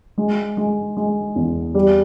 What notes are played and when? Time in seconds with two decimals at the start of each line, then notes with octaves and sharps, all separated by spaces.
0.18 G#3
0.57 G#3
0.97 G#3
1.36 E2
1.75 G3